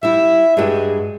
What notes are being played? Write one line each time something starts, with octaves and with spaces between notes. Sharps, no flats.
G3 E4 E5
G2 G#3 F#4 G4